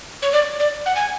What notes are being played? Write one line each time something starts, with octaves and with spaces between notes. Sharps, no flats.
C#5
D5
D5
F#5
G#5